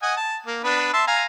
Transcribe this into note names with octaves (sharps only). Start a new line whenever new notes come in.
D#5 F#5 G#5
A5
A#3
B3 D4 B4
E5 A5 C6
F5 G#5 A#5